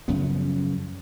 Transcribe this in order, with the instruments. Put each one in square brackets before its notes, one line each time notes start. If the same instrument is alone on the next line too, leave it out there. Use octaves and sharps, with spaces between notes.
[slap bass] F#2 C#3 F3 B3